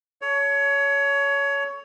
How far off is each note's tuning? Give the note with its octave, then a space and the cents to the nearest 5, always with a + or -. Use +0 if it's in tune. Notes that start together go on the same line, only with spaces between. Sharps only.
A4 +0 C#5 +20